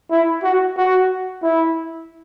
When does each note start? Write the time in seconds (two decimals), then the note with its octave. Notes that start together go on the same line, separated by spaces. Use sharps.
0.11 E4
0.43 F#4
0.77 F#4
1.43 E4